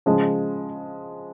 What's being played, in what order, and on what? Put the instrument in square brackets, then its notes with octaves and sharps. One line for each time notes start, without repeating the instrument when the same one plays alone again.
[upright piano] C#3 F3 G#3